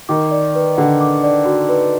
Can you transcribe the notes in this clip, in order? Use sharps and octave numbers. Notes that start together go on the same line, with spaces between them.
D#3 D6
D5
B4
D3 F#5
D6
D5
F#4
B4